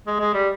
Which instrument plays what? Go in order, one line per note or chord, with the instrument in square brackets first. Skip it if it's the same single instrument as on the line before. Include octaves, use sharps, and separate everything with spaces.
[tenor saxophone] G#3
G#3
G3